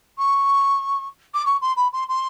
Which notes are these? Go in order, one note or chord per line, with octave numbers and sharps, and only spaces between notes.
C#6
D6
C#6
C6
B5
C6
C6